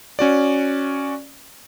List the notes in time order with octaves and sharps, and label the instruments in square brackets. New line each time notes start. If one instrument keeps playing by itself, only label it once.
[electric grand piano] C#4 F#4 D5